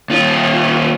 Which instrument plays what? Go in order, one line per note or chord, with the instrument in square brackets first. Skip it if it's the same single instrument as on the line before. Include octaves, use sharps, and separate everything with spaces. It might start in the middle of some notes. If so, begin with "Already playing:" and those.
[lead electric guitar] D#2 F4